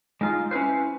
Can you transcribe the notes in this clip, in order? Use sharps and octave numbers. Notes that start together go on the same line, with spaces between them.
G#3 D#4 F4
C#4 E4 B4 C5